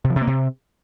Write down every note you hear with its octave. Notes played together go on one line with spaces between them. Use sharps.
C3
F3
C3
A#3
C3